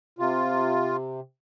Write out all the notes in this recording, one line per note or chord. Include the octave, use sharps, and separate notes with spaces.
C3 F4